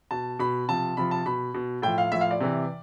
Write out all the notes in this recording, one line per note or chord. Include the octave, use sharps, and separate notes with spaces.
B2 A5
B2 B5
C3 F3 A5
C3 F3 B5
A5
B2 B5
B2
A2 F3 G5
F5
A2 F3 E5
F5
D5
C3 E3